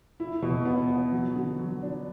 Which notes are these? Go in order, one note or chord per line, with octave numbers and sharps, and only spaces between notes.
E4
B2
B3
B3
F#3
D3
F#3
D4